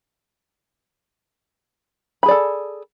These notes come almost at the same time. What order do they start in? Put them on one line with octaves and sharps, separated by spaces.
B5 G#4 D5 A4